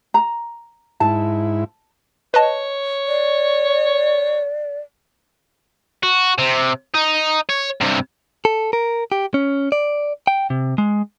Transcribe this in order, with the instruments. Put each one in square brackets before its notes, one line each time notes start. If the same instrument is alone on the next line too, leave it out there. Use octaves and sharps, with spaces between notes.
[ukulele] A#5
[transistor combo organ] G#2 E4 [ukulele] A5
[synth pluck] B4 D#5 A5 [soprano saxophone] C#5
[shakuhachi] D5
[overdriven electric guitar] F#4
C3
D#4
C#5
G2 C3
[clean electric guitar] A4
A#4
G4
C#4
D5
G5
C3
G#3